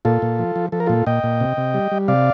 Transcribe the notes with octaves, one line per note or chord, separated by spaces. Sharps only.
A#2 F4 A4
A#2
F3
F3
F3 A4
A#4
A#2 F4 A4
A#2 D#5 G5
A#2
C3
C3
G3
G3
C3 D5 F5